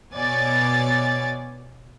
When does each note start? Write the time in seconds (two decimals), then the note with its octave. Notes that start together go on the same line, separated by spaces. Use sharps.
0.14 B2 B3 C#5 D5 G#5 A6